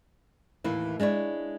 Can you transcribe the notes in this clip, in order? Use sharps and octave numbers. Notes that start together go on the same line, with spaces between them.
D#2 A2 E3 A#3 E4
G#3 D4 E4 C#5